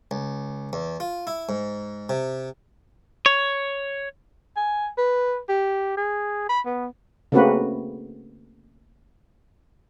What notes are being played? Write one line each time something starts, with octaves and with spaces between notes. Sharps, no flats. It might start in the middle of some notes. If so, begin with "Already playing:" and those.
C#2
E2
F4
E4
G#2
C3
C#5
G#5
B4
G4
G#4
B5
B3
C#3 A3 A#3 C4 F#4 B4